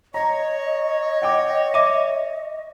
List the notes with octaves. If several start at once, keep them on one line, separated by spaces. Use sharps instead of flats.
C#5 D#5 A#5
F#5 G5 D6
E5 D6 D#7